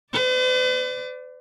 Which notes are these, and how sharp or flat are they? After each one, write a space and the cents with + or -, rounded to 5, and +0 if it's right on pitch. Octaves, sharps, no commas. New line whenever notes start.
B4 +45 D5 +0